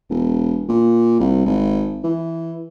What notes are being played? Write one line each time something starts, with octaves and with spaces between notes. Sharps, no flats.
E1
A#2
C2
G#1
E3